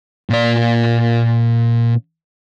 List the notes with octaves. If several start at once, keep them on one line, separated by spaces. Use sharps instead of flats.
A#2 D5